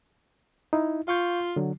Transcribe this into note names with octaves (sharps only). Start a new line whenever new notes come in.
D#4 E4
F4 F5 C#6 G6
D3 F#3